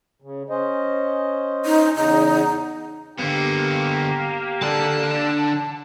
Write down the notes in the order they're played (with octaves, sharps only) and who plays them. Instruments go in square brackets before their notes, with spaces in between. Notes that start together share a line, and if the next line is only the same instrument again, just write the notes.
[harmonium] C#3
C#4 C5 D#5
[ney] D#4
[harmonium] E2 C#3 [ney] D#4
[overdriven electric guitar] D3 B3 [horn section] A#3 G4
[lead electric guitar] D3 D4 [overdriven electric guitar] A5